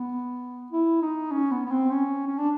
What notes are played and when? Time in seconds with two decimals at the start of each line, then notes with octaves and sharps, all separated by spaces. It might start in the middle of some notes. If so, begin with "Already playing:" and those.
Already playing: B3
0.72 E4
1.02 D#4
1.32 C#4
1.51 B3
1.66 B3
1.71 C4
1.91 C#4
2.27 C#4
2.39 D4